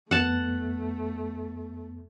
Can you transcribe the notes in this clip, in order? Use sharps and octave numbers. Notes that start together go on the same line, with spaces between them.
F2 A3 B3 F#5 A5